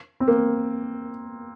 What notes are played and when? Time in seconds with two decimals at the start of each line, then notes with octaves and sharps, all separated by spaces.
0.20 C4
0.28 A#3